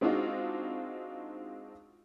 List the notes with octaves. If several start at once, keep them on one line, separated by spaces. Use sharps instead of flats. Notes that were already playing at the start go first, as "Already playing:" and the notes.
G#3 C4 D4 D#4 F4 F#4